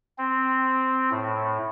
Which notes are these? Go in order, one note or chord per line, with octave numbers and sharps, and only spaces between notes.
C4
A2